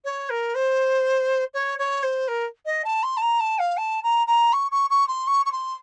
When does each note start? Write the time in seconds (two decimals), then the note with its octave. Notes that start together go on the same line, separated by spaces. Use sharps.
0.04 C#5
0.30 A#4
0.54 C5
1.54 C#5
1.78 C#5
2.03 C5
2.28 A#4
2.65 D#5
2.84 A5
3.03 C6
3.17 A5
3.22 A#5
3.40 A5
3.59 F5
3.77 A5
4.03 A#5
4.27 A#5
4.53 C#6
4.71 C#6
4.90 C#6
5.08 C6
5.27 C#6
5.45 C#6
5.52 C6